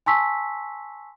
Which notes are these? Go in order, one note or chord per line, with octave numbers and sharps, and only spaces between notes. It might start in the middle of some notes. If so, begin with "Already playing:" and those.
G#5 A5 C6 C#6 E6 B6